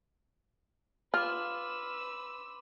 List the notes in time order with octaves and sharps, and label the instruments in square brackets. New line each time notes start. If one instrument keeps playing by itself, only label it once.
[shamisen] F4 [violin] B4 E6 [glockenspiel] C6 D6 [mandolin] F6